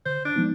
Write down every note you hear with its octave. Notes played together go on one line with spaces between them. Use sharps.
D3 C5
D4
F3 G#3 B3 D#4